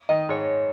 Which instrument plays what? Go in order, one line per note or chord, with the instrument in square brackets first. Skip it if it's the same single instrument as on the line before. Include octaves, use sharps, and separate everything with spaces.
[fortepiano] D#3 D#4 [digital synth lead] D#5
[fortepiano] G#2 G#3 [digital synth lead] C#5